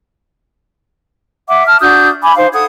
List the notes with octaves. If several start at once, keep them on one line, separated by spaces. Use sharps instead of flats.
E5 F#5 D6
A5 F6
D4 F#4 D#6 G6
G#5 B5 D6
D#4 C5 F5
A4 F#5 D#6 G#6